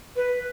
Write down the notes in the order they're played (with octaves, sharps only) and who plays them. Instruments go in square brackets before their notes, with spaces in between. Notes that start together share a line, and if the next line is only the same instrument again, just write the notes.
[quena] B4